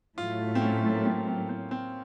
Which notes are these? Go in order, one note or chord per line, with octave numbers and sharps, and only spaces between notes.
A2 F#3 A3 F4
C4
C#4
A#3
C4
C4
C4
C4